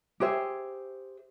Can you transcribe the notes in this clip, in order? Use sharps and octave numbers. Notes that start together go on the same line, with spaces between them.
G4 G#4 C5 E5